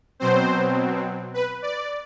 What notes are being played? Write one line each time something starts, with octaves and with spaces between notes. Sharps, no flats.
B2 F#3 C4 C5
B4
D5